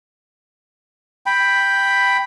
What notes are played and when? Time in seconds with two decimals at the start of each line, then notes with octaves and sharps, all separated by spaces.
1.26 G5 B5